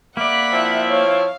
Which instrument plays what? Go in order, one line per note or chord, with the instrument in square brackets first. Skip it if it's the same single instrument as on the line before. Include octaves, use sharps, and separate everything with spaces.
[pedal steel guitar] A#3 D5 [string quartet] E5 F#5 B5
[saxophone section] F3 C4 E4
[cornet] C#5 [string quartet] F5